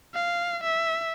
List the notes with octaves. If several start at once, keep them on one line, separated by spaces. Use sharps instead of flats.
F5
E5